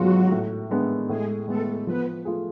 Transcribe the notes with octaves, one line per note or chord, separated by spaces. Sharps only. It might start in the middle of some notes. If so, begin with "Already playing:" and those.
Already playing: G#2 F#3 G#3 B3 F4 F#4
A2
G#3 B3 D4
A2 G#3 G#4
G#3 A3 B3 A4
F3 B3 B4
A3 F4 G#4